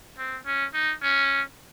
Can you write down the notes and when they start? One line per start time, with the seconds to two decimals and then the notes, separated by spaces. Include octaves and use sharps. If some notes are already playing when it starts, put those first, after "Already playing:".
0.18 C4
0.46 C#4
0.74 D#4
1.02 C#4